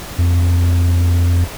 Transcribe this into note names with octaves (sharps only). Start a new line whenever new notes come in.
F2